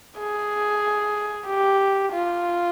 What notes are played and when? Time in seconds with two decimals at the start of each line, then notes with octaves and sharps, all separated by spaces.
0.18 G#4
1.47 G4
2.12 F4